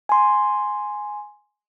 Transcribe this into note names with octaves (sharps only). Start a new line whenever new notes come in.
G#5 C6